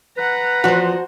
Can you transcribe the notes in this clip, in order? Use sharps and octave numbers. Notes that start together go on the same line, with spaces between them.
B4 F#5 A#5
E2 F3 F#4 C5